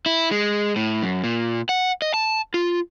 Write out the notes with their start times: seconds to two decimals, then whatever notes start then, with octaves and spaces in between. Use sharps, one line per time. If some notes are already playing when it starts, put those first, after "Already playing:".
0.06 E4
0.31 G#3
0.76 A2
1.03 F#2
1.24 A#2
1.69 F#5
2.02 D#5
2.14 A5
2.54 F4